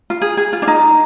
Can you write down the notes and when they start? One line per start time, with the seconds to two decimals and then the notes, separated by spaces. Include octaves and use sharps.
0.10 F4
0.22 G#4
0.37 G#4
0.53 F4
0.62 D4
0.67 D#4